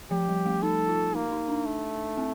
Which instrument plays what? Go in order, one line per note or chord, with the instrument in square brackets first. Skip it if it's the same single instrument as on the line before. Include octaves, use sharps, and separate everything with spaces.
[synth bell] F3 [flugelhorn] G4
[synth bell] G3
A3
[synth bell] D#4 [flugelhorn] A4
[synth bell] F4
[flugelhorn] A#3 [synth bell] D#4
[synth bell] D#4
D4
[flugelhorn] A3
[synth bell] C4